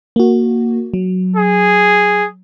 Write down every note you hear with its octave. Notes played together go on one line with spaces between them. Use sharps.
A#3 F#4
F#3
G#4